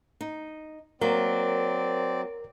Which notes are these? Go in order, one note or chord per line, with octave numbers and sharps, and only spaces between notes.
D#4
F#3 A#3 C4 A#4 D5